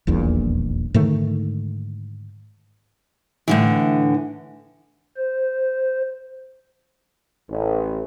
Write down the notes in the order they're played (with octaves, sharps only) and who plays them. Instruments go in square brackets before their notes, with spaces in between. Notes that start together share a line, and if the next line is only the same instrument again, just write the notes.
[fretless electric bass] D#1 A#1 E2 A#2
G#2 D3 D#3 A3
[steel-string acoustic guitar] A2 D3 E3
[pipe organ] C5
[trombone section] A1